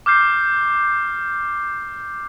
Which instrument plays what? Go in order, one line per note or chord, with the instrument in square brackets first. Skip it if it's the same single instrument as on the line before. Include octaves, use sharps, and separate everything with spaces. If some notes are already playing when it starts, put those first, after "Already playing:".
[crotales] D6 F6 G6 C7